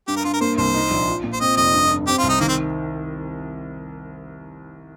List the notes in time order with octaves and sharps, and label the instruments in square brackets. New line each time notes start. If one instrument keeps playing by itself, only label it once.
[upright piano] G2 [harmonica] G4
[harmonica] A#4
[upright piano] G2 [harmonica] F4
[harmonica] A#4
[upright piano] A#3 [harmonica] C5
[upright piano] C2 [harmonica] C5
[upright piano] D#4
A#1
F4
A#2
[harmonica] C5
[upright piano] C4 [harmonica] D#5
[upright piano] F1 [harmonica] D#5
[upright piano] G2
G2
[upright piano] C4 [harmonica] G4
[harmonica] F4
[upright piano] C2
[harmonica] D#4
[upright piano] D#3 [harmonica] A#3
[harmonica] C4